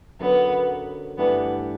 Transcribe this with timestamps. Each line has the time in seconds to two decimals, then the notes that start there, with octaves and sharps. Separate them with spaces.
0.20 F#2 D3 F#3 B3
1.18 G2 E3 A3 B3 D4 G4